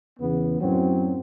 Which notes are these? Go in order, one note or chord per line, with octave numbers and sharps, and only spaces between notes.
E2 C#3 B3
F#2 A2 F#3 C4